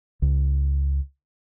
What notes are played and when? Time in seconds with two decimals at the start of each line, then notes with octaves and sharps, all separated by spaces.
0.22 C#2